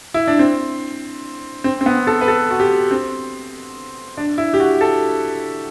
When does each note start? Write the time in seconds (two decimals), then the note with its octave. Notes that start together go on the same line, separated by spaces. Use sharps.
0.14 E4
0.27 D4
0.39 C4
1.64 C4
1.81 C4
1.86 B3
2.07 A4
2.21 B4
2.28 A4
2.50 F#4
2.60 G4
2.91 C4
4.17 D4
4.38 E4
4.54 G4
4.60 F#4
4.81 A4